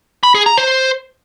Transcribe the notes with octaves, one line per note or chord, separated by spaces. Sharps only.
B5
G#4
A#5
C5